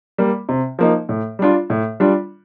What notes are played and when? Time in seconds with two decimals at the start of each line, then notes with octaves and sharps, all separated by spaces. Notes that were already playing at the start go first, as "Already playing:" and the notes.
0.18 G3 A#3
0.49 C3
0.79 F3 A#3 D#4
1.09 A2
1.39 G3 D4 F4
1.70 A2
2.00 G3 D4 F4